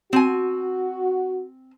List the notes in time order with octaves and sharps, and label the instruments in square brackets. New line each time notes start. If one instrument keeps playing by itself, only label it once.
[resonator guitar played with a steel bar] C4 G#5 [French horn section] F#4